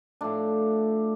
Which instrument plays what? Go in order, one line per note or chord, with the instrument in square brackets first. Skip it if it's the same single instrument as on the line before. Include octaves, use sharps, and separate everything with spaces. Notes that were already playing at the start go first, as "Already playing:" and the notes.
[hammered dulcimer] A2 F3 A3 D4